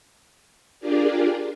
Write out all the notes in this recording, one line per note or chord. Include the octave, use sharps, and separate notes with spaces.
D4 F4 G4 G#4 A#4 D5